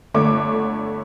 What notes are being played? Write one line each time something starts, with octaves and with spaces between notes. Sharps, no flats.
G1 D3 A3 C#5 D6